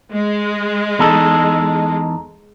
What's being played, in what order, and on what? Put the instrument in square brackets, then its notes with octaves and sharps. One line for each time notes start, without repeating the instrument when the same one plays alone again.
[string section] G#3
[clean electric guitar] E2 D#4 A4